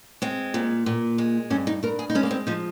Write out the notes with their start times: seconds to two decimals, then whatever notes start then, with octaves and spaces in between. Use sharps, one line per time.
0.22 G#3 C4
0.54 A#2
0.86 A#2
1.18 G#3
1.50 G2 C#4
1.67 D#4
1.83 G2 A#4
1.99 G#4
2.10 D#4
2.15 G#3 C#4
2.23 A#3
2.31 C4
2.47 F3 D#4